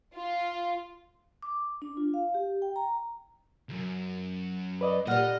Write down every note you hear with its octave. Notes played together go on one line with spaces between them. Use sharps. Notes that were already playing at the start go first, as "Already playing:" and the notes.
F4
D6
D4
F4
F5
G4
G5
A#5
C#2 F#2
B4 D5 D#5
A#2 D3 G3 D#5 F#5 F6